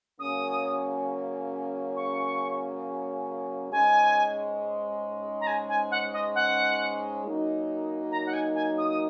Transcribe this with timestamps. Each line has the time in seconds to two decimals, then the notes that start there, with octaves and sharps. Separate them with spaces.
0.19 C#3 F#3 A#3 C#4 D#6
1.96 C#6
3.72 G#2 G#3 C#4 G#5
5.41 A#5
5.47 G#5
5.69 G#5
5.91 F#5
6.13 D#5
6.35 F#5
7.24 F#2 F#3 A#3 D#4
8.11 A#5
8.26 F#5
8.33 G#5
8.55 G#5
8.78 D#6
8.89 D#6